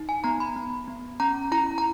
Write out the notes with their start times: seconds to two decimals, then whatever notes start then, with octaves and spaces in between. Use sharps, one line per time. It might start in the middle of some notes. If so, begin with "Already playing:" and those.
Already playing: D#4
0.09 G#5
0.24 B3 A#5
0.40 B5
0.56 B3
0.88 B3
1.20 C#4 A#5
1.52 E4 A#5
1.78 A#5